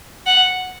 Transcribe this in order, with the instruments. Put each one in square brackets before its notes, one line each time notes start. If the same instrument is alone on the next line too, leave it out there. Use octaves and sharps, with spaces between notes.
[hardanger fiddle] F#5